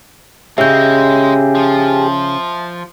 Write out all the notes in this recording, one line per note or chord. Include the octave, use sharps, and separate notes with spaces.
C#3 G#3 C#4 G4 G#4 E5 G6
F3